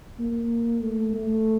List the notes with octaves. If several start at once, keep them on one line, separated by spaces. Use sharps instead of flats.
A#3
A3
A3